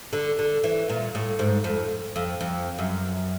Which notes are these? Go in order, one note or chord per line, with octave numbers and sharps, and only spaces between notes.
D3
D3
E3
A#2
A2
G#2
F2
F2
F2
F#2